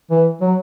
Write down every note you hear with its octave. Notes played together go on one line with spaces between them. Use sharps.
E3
F#3